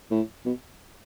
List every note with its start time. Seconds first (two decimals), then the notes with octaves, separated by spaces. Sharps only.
0.11 A2
0.46 B2